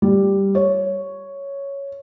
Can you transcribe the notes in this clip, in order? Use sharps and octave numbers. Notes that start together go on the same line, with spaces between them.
G3
C#5